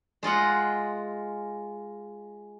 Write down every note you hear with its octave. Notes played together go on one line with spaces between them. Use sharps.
G#3 F4 D#5 F#5